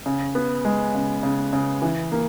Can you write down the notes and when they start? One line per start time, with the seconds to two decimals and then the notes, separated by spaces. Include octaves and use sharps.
0.06 C#3
0.35 B3
0.65 G#3
0.95 C#3
1.23 C#3
1.53 C#3
1.82 E3
2.12 A#3